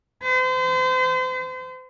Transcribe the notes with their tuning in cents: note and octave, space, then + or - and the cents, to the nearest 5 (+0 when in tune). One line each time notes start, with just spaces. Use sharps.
C5 -35